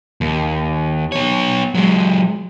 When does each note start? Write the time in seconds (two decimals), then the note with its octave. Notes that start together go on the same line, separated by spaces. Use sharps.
0.21 D#2
1.12 B3 C#5
1.75 F#3 G#3